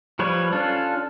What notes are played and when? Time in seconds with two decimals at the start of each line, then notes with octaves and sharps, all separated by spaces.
0.19 F3 G3 B4 C#5
0.52 C#4 D4 F4 A4